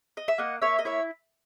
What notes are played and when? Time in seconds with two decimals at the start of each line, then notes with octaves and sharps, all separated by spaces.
0.17 D#5
0.28 E5
0.38 A#3 D#5 F#5
0.62 A#3 C#5 E5
0.79 D#5
0.85 E4 C#5 E5